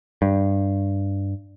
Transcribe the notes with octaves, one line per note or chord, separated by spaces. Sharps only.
G2